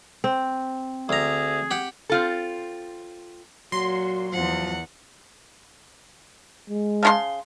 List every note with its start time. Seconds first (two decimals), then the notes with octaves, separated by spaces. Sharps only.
0.24 C4
1.09 D2 G#4 A#5
1.71 G4 F#5
2.09 C4 F4 A4
3.72 A#2 F#3 F#4 C6
4.32 E2 F3 F#5
6.70 G#3
7.03 C#3 F4 F5 A5 C6 F6